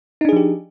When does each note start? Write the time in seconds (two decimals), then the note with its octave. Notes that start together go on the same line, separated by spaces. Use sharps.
0.21 D#4
0.25 D4
0.29 G#4
0.33 F3
0.36 G4